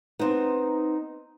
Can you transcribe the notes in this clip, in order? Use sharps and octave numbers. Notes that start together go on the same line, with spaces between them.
B3 C4 D#4